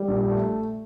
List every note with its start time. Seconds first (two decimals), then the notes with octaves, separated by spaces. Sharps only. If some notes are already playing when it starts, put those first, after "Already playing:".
Already playing: G3
0.08 A#1
0.31 A3